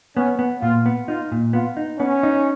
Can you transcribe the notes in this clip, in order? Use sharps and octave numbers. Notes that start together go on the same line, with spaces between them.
B3 C#4
B3
A#2 F4
B3
D#4 F4
A#2
B3 F4
D#4
B3 C#4
D#4